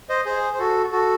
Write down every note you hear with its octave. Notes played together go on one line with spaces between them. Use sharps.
C5 D#5
G#4 C5
C5
F#4 A4
F#4 A4